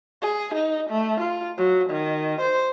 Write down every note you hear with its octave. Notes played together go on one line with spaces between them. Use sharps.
G#4
D#4
A3
F4
F#3
D#3
C5